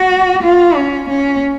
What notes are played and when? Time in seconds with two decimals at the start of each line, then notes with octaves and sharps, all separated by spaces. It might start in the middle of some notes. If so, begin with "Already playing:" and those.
Already playing: F#4
0.42 F4
0.75 C#4
1.09 C#4